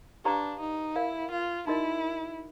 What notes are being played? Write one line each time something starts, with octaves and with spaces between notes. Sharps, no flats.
D4 G4 B4 D5 F5 A#5
D#4
E4 A#4 D5 F5
F4
D#4 E4 F#4 A#4 D#5